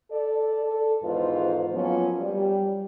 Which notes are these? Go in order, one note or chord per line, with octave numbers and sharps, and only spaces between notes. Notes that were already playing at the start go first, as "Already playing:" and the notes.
A4 D5
A4
E2 G#2 D#3 F4 B4 C5
F3 F#3 A#3 B3 C#4 F4
G3